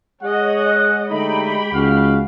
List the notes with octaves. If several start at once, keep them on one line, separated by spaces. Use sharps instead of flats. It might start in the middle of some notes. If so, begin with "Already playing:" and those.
G#3 G#4 C#5 D#5 F#5
D3 A3 D#4 G4 G5 B5
C#2 D#4 F#4 G#4 F5